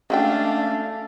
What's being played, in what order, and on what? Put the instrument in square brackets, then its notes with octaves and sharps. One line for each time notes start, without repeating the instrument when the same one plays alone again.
[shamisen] G#3 F#4 G5 [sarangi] A3 [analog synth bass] C#4 [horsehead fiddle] D4 F5